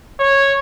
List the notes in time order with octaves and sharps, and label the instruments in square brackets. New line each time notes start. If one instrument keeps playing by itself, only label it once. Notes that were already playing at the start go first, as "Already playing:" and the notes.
[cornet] C#5